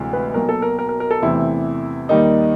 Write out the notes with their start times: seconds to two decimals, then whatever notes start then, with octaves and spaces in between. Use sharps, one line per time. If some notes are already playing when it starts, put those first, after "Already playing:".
Already playing: D2 C3 E3 G#3
0.13 B4
0.34 B1 B2 F#3 A#3 A#4
0.49 A4
0.62 A#4
0.79 A#4
0.89 A#4
1.00 A#4
1.11 A4
1.22 E2 C3 E3 A3 E4
2.09 D#2 D#3 G3 A#3 D#4